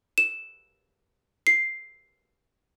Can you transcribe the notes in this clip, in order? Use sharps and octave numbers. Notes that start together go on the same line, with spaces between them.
E7
C7